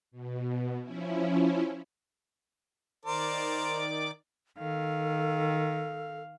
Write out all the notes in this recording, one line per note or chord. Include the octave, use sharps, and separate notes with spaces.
B2
F3 C#4 E4
D#3 A#4 C5 D5 D6
D#3 A4 F5